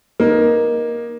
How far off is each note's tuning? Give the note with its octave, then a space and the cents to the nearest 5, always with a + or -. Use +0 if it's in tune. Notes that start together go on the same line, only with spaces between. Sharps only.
A#3 +15 D#4 +0